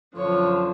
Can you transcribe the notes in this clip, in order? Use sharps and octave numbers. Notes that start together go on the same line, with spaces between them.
F#2 D3 F3 C#5